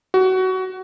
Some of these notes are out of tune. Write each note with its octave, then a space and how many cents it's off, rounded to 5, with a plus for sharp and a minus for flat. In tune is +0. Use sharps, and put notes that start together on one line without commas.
F#4 +20